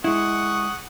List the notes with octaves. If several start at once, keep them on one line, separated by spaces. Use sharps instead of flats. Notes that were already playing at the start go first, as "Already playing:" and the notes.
G#3 E4 F#5 C#6 D#6